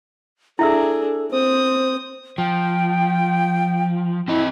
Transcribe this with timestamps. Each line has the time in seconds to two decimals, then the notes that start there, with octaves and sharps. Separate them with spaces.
0.59 D4 E4 G#4 A4 E5 E6
1.31 C4 C5 D#6
2.38 F3 G5
4.28 C4 E4 D#5